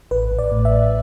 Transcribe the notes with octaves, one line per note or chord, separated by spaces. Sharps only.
A1 B4
A1
D5
A2
E5
A1